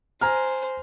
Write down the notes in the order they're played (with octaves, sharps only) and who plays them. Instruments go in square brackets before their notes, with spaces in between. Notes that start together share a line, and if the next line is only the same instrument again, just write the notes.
[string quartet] C5 [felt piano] G#5 A#5 F6